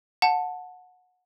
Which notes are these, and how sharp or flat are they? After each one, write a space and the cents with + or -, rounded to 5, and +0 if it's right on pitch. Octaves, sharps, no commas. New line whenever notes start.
F#5 -20 A5 +0